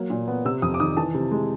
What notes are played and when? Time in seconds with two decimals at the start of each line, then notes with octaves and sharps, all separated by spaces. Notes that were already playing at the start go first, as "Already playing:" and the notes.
Already playing: F#3 A#3
0.10 A#2
0.28 B3
0.45 C3 E6
0.62 F2 D#6
0.74 D6
0.80 D#3 D#6
0.97 E3 A5
1.14 C3
1.31 G#3